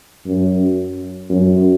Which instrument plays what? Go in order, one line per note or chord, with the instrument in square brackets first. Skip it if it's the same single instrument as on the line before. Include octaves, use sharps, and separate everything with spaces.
[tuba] F#2
F#2